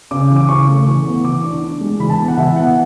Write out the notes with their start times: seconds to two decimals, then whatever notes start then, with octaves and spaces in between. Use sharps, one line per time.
0.11 C#3 D6
0.30 E3
0.36 D6
0.49 C#3 C#6
0.68 A3
0.87 E3
1.06 B3
1.24 E3 D6
1.43 D4
1.62 D4
1.81 G#3
2.00 E3 B5
2.10 A5
2.19 B3
2.28 F#5
2.37 E3 E5
2.56 B3 F#5